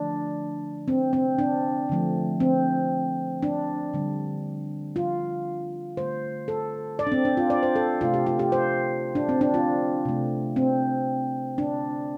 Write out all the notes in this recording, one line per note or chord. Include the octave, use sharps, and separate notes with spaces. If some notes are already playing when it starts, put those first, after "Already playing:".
Already playing: D3 F3 A3 D4
C4
C4
D4
D3 F3 A3
C4
D4
D3 G3
F4
D3 A3 C5
A4
D5
D4
C4
D4
F4
D5
C5
A4
C3 A3 F4
G4
F4
G4
C5
D4
C4
D4
F4
C3 A3
C4
D4